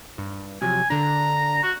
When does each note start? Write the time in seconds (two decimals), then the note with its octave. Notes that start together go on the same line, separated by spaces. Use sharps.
0.18 G2
0.62 C3 F3 F#3 G#5
0.90 D3 D4 A#5
1.63 F#4